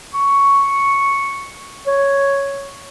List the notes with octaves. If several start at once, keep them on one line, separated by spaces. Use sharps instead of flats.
C#6
C#5